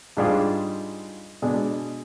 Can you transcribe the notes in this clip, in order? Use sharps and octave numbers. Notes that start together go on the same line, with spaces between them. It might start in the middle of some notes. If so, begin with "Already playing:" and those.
G#2 G3 D4 F4 G#4
B2 G#3 D4